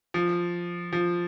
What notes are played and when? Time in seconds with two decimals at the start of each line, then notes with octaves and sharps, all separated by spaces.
0.14 F3
0.93 F3